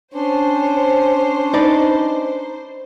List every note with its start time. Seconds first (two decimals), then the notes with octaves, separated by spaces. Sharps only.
0.14 C#4 D4 C5
1.54 D#4 B4 D5